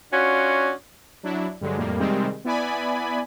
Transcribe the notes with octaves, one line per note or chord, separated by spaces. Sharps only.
C#4 D4 F4 F#4
F#3 D4 E4
G2 D3 F#3 G#3
F2 A2 G3 A#3
C3 D#3 G3 G#3 C4
B3 E4 D5 G#5 B5